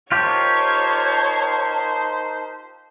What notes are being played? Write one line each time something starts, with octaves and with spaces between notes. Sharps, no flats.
D#4 F4 G4 A#4 C5 C#5 A5